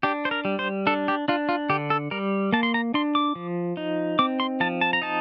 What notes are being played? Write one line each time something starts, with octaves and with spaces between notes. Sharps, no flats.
D4 G4
C5
A#4
G3
C5
D4 A4
G4
D4 F4
F4
D3 G4
A4
G3 A#4
A#3 A5
C6
A#5
D4 C6
D6
F3
D#4
C4 D6
C6
F3 A5
A5
A#5
D#4 A5